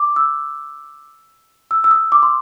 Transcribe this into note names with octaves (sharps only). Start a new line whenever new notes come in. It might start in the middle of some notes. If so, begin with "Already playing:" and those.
Already playing: D6
E6
E6
E6
D#6
D6
C6